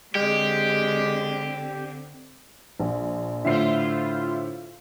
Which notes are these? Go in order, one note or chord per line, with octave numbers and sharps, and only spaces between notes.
D3 G#3 C4 G4
A#1
A2 D3 E4 F4 C5 E5 C7